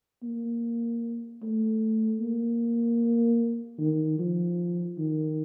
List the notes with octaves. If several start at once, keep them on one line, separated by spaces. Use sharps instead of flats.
A#3
A3
A#3
D#3
F3
D#3